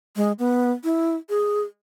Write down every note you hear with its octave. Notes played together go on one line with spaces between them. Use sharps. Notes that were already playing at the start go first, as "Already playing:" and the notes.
G#3
B3
E4
G#4